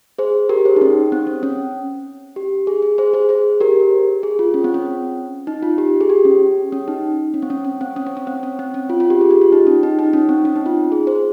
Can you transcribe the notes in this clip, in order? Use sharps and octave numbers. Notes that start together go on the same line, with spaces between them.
G#4 C5
G4 A#4
G#4 C5
D#4
C#4
C4
C#4
C#4
G4
G#4
G#4
G#4 C5
G#4 C5
G#4 C5
G4 A#4
G#4
F4
C#4
C4
C#4
D#4
F4
G4
G#4
G4
C#4
C#4
D#4
C#4
C4
C#4
C#4
C4
C#4
C4
C#4
C4
C#4
C4
C#4
F4
F4
G4
G#4
G4
F4
D#4
C#4
D#4
D#4
C#4
C4
C#4
D#4
F4
G#4
G#4 C5